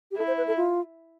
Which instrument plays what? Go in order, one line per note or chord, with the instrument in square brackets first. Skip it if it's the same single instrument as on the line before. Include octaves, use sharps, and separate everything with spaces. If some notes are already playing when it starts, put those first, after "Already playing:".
[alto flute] G4
[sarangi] E4 [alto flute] A4
[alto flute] C5
B4
A4
F4